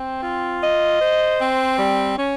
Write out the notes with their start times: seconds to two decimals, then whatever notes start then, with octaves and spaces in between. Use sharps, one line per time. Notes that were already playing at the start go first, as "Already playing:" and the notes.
Already playing: C4 C5
0.23 F4
0.62 D#5
1.02 C5
1.40 C4
1.79 G3
2.18 C#4